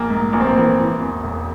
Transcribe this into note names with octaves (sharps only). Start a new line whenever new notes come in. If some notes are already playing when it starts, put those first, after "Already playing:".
Already playing: A#1 A#3
G#2
A#1 A#3
C4
A#3
E3
E3
E2
E1